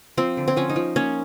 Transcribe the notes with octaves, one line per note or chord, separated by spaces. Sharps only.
F3 C4
D3
C4
F3 C#4
D#4
F3
A#3 C#4